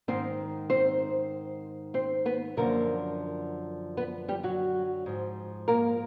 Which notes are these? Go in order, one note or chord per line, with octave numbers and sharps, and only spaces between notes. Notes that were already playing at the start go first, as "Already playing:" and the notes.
G#2 D#3 C4 C5
C4 C5
C4 C5
B3 B4
F#2 D3 F3 A#3 A#4
B3 B4
G3 G4
F#3 F#4
G#2 F3
A#3 A#4